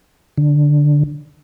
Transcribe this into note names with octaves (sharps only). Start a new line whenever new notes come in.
D3